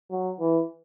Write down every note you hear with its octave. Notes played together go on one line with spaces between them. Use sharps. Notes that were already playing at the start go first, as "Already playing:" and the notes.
F#3
E3